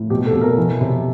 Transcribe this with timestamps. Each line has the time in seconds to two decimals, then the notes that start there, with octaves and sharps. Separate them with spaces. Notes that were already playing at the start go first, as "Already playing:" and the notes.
Already playing: A2
0.10 B2 G4
0.26 A4
0.34 B2
0.41 A#4
0.57 E3
0.81 C3